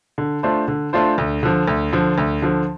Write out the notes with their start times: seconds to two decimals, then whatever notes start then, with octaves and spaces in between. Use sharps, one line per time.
0.18 D3
0.43 A3 D4 F4 C5
0.68 D3
0.93 A3 D4 F4 C5
1.18 D2
1.43 D3 F3
1.67 D2
1.93 D3 F3
2.18 D2
2.42 D3 F3